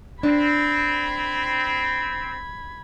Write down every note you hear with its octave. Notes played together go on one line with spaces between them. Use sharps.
C4 D4 B5 G#6